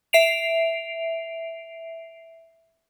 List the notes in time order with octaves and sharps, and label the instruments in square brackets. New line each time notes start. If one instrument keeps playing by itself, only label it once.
[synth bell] E5 C7 D7 F7